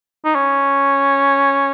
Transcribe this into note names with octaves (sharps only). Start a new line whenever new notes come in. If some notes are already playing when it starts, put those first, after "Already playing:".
D#4
C#4